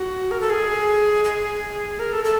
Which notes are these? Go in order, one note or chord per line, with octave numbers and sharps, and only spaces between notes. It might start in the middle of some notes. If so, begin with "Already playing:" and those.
Already playing: F#4
A#4
A4
G#4
G#4
A#4
A4
A4